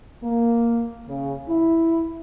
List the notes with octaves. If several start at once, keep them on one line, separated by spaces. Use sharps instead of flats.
A#3
C#3
E4